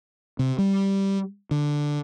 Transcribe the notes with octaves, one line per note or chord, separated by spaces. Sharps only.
C3
G3
D3